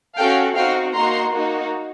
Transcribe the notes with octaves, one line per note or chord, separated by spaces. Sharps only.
C#4 F#4 A4 F5 G5
C4 D#4 F#4 F5 G5
A#3 D#4 F#4 A#5 C6
A#3 D#4 F#4